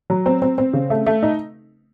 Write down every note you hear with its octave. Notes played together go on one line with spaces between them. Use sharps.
F#3
C4
C4
C4
C#3
A3
A3
D#4